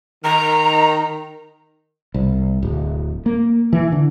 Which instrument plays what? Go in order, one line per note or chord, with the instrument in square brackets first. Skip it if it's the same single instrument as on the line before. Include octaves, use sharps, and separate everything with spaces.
[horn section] D#3 [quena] A#5
[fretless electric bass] C2
D1
A#3
E3
D3